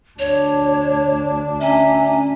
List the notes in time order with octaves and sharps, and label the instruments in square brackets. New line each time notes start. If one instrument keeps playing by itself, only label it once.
[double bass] D2 D4 [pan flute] C#5
[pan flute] C#4 [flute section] E5 G#5 A#5